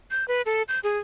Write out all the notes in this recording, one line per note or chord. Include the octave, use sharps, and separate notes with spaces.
G6
B4
A4
G6
G#4